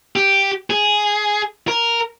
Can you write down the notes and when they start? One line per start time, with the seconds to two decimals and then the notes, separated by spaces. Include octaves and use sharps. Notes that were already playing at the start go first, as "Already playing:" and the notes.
0.16 G4
0.70 G#4
1.68 A#4